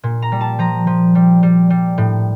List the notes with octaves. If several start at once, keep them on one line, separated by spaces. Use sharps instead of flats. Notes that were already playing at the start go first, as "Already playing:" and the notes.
A#2
A#5
G3
A5
F3 A#5
F3
G3
G3
G3
A2